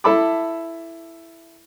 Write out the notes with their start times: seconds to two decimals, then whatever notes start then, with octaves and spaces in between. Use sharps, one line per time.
0.04 E4 A4 E5 A5 B5 D6